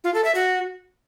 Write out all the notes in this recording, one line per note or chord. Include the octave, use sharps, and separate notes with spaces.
F4
A4
E5
F#4